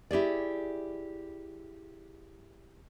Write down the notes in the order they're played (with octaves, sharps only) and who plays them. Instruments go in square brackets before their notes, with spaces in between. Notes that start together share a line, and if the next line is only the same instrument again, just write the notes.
[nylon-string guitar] E4 G4 G#4 D5